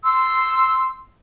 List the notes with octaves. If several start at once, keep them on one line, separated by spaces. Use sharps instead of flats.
C6 E6